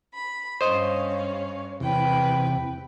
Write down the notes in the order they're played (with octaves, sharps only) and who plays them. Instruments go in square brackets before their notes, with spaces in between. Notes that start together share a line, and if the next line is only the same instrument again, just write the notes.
[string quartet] B5
[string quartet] G2 C#4 F5 [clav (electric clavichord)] C5 D#5 [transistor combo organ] C#5
[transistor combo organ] E2 C3 [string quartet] B4 G5